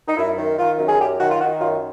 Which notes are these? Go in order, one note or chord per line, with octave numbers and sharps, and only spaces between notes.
D#4
F#2 E4
D#3
D#3 F4
F#2
G#4
F#2 G4
D#3 F#4
F4
D#3 F#4
F#2 F4